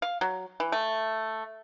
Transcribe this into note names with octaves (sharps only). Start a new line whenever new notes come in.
F5
F#3
E3
A3